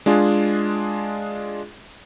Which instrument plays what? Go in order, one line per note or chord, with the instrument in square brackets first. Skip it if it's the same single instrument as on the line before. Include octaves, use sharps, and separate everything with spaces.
[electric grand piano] G#3 D4 F4 G#4